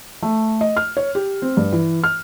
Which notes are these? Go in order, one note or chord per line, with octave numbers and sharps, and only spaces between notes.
A3
D#5
F6
C#5
G4
C4
G2
E3
F6